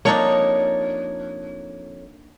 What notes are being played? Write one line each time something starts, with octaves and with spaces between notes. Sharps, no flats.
F2 A#3 D4 D#4 C#5